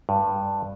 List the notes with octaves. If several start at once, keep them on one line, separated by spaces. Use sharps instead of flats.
G2